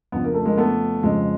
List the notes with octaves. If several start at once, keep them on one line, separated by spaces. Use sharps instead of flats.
F2 C#3 F3 B3
A#3
A3
G#3 A#3
A3 B3
F2 C#3 F3 G#3